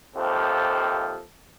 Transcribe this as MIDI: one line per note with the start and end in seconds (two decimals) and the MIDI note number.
0.17 1.21 39
0.17 1.21 48
0.17 1.21 53
0.17 1.21 60
0.17 1.21 69